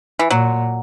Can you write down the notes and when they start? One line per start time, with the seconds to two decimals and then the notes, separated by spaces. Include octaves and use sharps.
0.19 E3
0.31 A#2 F#3